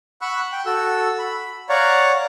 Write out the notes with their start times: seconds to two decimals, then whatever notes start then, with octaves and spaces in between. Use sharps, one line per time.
0.21 F#5 B5 C#6 E6 F#6
0.52 G5
0.66 F#4 A4 E6
1.19 B5
1.69 C#5 D5 F5 F#5 A#5 C#6